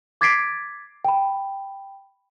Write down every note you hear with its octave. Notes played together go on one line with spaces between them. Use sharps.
D6 G#6 A6 B6 C7 D7
G5 B5